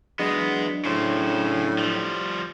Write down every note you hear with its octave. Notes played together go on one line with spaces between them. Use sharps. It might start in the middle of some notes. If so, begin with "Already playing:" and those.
E2 F#3 G#3 B3 D4
A2 C#3 C5
F3 G3